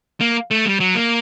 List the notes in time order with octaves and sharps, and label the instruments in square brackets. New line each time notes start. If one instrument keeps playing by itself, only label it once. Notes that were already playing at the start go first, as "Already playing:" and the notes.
[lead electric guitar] A#3
A3
G3
F#3
A#3